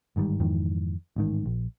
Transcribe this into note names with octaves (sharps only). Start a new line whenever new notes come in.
G1 G#2 D#3 G3
F2 G#2 D#3 E3
A1 G#2 D#3
A#1